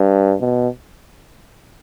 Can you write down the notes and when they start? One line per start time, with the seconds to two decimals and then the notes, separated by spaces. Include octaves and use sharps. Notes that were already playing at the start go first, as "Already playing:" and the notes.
Already playing: G2
0.41 B2